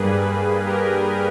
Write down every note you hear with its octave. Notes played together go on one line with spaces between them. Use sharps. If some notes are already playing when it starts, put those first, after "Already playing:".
Already playing: G2 G3 A#3 G#4 B4
G4 A#4